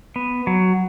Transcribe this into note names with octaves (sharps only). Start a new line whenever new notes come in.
B3
F#3